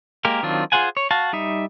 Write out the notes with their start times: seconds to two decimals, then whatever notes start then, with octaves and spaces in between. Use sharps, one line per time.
0.25 G#3 A#3 G4 A#4
0.43 D#3 F#3 C4 D4 F4
0.72 F4 G#4 C5 F#5 G#5
0.97 C#5
1.11 F#4 F5 A5
1.33 G3 D#4 E5